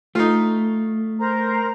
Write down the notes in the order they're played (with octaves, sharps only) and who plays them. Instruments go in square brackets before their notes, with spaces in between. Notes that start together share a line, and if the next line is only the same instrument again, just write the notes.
[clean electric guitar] A3 [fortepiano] D#4 F4
[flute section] A#4 C5 A#5